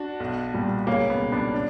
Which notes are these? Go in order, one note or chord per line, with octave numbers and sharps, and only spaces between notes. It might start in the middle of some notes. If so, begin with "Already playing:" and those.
Already playing: D4 F#4
B1
A#2 G3
C#2 A#3 C#4
B3
B2 G3
B3 D4
D4